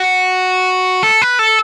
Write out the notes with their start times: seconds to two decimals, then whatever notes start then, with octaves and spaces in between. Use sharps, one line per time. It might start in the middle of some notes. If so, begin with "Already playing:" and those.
Already playing: F#4
1.03 A4
1.22 B4
1.39 A4